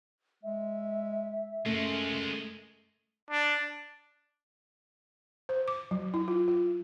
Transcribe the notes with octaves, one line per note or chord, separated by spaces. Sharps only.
G#3 E5
F#2 G#3 A3 F4
D4
C5
D6
F#3
E4
F4
F4